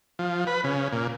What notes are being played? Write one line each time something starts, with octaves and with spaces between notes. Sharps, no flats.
F3
B4
C#3
A#2